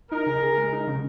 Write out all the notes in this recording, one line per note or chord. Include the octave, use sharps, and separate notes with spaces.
D#4 A#4
C#3
G#4
G#3
D#4
C#3